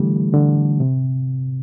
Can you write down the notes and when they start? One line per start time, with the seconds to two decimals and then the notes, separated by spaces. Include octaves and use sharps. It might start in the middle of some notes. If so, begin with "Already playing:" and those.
Already playing: D3 E3 G3 A3
0.33 D3
0.80 C3